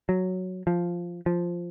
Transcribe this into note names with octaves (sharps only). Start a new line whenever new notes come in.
F#3
F3
F3